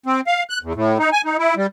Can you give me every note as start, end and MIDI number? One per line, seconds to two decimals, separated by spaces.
0.06 0.21 60
0.27 0.43 77
0.50 0.59 90
0.63 0.73 40
0.75 0.98 45
0.99 1.10 63
1.13 1.22 80
1.25 1.37 63
1.39 1.55 64
1.57 1.67 55